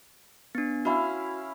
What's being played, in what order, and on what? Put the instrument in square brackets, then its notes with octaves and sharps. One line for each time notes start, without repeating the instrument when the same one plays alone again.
[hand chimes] B3 D4
[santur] C#4 E4 F5 [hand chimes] F#4